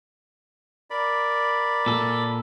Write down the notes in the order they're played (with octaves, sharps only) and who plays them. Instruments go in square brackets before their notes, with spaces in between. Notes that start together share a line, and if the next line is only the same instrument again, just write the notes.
[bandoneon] A#4 D5 B5
[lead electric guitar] A#2 A4